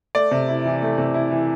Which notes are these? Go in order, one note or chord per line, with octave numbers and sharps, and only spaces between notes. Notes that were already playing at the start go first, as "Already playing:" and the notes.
A3 D5
C3
E4
E3
A3
C3
E4
E3